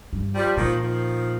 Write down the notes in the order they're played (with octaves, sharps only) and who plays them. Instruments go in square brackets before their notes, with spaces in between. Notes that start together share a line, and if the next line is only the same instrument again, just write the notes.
[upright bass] G2
[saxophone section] F3 G3
[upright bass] A#2 [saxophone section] D#3 F3
[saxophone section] D#3 F3